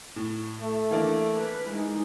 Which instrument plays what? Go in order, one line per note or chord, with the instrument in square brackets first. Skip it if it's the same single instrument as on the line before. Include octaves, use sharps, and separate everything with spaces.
[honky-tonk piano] A2
[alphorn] A3
[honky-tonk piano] E3 A#3 D4
[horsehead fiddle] B4
G#3 D#4